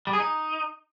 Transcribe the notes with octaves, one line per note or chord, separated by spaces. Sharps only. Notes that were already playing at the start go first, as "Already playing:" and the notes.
G3
G#4
D#4